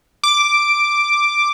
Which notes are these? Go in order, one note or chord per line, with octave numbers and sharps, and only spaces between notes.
D6